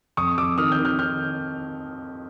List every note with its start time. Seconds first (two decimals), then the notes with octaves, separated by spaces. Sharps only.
0.17 F2 C#6 D#6
0.38 F2 D6 E6
0.58 D#3 D#6 F6
0.72 F6 G6
0.79 D#3
0.85 F6 G6
0.99 D#3 F6 G6